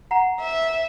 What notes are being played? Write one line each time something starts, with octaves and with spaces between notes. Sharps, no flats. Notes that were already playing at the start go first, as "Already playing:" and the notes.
F#5 A#5
E5